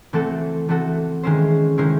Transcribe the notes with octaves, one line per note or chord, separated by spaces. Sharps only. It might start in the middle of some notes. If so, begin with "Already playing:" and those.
E3 A3 C4 F#4 A4
E3 A3 C4 F#4 A4
D#3 G#3 C#4 E4 C5
D#3 G#3 C#4 E4 C5